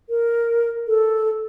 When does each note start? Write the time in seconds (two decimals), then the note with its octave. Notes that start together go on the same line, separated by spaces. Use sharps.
0.10 A#4
0.88 A4